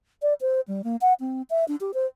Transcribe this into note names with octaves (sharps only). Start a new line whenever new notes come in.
D5
C5
G3
A#3
F#5
C4
E5
D4
G4
C5